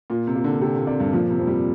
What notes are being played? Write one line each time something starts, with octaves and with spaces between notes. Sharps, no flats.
A#2 F4
C3
A#3
D3
C3 G4
A#2
C3 D5
G2
A#2 F3
C3
F2
G3